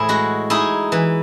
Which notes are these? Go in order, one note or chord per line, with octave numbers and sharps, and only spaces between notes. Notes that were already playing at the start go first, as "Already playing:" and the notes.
Already playing: A2 E3 E4 G#4 C5
G#3 F#4
D#4 E4 G#4
E3